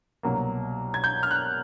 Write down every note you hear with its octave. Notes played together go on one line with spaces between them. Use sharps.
C2 B2 F#3 A#3
G#6
G6
F6
F#6